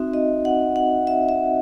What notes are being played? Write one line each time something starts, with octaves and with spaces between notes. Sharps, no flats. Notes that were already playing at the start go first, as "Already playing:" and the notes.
Already playing: C4 D#4 F#4 E5
D#5
F#5
F#5
E5
E5